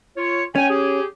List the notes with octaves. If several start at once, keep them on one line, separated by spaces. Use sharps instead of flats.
F4 C#5
C#4 G5 G#5
G4 G#4